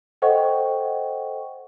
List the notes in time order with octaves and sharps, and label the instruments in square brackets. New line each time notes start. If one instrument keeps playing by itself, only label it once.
[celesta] A4 C5 D#5 F#5 G5 C#6